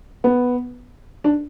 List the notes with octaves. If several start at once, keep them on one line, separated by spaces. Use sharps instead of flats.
B3
D4